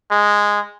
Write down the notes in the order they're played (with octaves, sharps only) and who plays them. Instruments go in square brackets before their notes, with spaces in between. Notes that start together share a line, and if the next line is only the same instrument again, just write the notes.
[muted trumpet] G#3